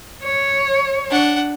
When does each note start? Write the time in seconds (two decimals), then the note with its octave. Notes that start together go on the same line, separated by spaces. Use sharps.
0.23 C#5
1.10 D4 F#5